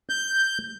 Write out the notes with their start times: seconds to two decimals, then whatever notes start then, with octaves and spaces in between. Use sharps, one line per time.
0.09 G6